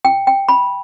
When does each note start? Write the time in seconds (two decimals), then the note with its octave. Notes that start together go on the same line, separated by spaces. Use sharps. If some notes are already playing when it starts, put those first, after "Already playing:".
0.05 G5
0.27 G5
0.49 B5